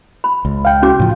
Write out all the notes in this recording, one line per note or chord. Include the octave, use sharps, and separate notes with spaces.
B5
C#2
F5 G5
C#4 F#4 D6
A2 C#3 F3